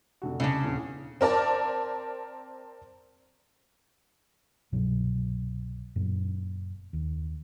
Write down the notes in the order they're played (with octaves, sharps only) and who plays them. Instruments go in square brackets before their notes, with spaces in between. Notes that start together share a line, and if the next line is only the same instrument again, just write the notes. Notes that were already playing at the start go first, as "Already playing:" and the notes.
[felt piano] F1 D3 F#4
[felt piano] C2 [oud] C#3 D4
[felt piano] D#1 E2
[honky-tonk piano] C4 A#4 D5 A5
[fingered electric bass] C2 G2 B2 F#3
F#1 F#2 A#2 B3
D#2